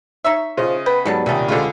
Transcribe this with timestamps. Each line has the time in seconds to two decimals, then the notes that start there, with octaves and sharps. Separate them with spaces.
0.24 D#4 C#5 E5 E6
0.57 C#3 F3 F4 D#5
0.86 B3 B4 G5
1.05 G#2 B2 F#3 G3 B3 A4 A5
1.26 C2 A#2 D3 D#3 C#4 E5 A5
1.48 C#2 D3 G#3 F4 G4 C5